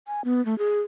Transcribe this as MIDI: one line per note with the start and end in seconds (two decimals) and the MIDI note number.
0.07 0.24 80
0.24 0.44 59
0.45 0.57 57
0.58 0.80 68